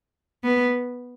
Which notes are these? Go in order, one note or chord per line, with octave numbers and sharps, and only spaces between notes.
B3